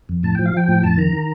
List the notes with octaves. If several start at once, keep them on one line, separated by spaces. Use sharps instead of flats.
F2
A2 A5
F3 G5
F5
F3 G5
A2
F2 A5
D#3 A#5
D#3